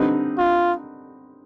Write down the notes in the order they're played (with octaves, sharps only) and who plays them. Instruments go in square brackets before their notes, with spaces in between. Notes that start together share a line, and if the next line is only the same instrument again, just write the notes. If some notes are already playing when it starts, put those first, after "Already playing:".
Already playing: [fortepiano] D3 G3 C4 D#4 B4
[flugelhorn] F4